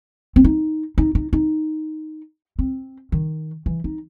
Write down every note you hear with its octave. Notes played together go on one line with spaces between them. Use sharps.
C4
D#4
D#4
D#4
D#4
C4
D#3
E3
D#4